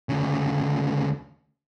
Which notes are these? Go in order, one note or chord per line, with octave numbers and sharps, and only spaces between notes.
D2 C#3